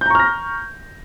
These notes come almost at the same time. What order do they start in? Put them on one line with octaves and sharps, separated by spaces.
G6 A#5 C#6 F6 A#6